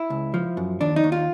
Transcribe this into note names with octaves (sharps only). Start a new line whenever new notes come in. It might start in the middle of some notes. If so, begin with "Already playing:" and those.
Already playing: E4
C#2
F3
F#2
D#2 D4
D#4
D#2
F4